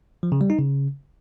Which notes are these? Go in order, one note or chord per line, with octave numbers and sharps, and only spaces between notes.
F3
C#3
G3
D#4
C#3